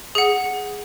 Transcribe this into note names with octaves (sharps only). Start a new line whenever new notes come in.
G#4 F#5